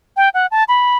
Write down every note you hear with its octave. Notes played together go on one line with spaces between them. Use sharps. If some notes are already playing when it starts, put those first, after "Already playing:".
G5
F#5
A5
B5